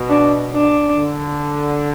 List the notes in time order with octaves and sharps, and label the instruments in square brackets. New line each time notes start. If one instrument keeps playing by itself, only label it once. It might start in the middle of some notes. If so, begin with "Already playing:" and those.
Already playing: [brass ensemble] B2
[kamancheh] D4
D4
[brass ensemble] D3